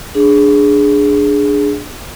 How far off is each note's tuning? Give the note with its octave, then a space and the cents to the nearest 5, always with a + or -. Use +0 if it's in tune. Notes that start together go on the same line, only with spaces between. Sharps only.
D4 +0 G#4 +0